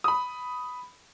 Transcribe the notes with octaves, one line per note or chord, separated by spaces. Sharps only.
B5 D#6